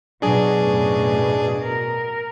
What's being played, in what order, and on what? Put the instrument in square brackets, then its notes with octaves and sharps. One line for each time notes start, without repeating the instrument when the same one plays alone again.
[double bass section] B2 [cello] F#3 [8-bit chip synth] D4 G#4
[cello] F#2 A2
A#4